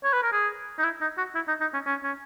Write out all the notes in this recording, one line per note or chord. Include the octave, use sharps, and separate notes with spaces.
C#5
B4
A#4
G#4
D#4
E4
D#4
F#4
E4
D#4
D#4
C#4
C#4
C#4